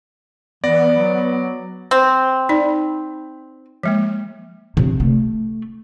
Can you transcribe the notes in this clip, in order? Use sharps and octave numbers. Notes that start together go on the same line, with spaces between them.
E3 B3 D5 A#6
F#3
C4
D#4 D5
F3 G#3 A#3
C3
A3